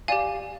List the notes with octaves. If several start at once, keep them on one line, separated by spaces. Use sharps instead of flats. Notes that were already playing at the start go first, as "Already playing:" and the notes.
G4 D5 F5 G#5